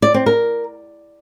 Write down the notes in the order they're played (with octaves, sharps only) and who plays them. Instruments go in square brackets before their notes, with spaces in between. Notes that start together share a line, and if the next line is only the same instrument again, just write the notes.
[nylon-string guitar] D5
C4
A#4